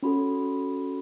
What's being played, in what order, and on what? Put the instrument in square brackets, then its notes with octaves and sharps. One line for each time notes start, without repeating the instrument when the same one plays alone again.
[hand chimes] C#4 F#4 A4 B5